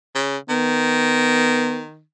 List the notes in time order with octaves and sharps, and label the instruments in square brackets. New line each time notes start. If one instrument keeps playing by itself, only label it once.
[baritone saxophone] C#3
[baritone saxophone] D#3 [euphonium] B3